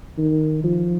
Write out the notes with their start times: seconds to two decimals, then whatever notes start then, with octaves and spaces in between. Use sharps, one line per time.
0.18 D#3
0.64 F3